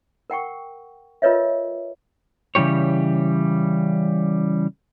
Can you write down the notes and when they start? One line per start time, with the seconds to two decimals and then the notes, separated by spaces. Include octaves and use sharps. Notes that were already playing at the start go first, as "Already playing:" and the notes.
0.30 A#4 F#5 G5 C#6
1.22 F4 A#4 B4 C#5 D#5 E5
2.55 C#3 E3 G3 G4 C#5